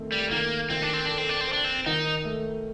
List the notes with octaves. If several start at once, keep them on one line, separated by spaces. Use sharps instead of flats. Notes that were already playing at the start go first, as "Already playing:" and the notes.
Already playing: D#3 A3 C4
G3
D#3 A#3
D#3 C4
D4
C4
D4 A4
C4
D4
C4
C5
D4
C4
D#3 D#4
A3